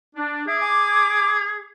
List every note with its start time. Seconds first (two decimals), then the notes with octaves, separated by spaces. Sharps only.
0.16 D4
0.47 G#4 E5 D6
0.59 G#5 D6